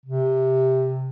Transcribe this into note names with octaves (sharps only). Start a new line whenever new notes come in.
C3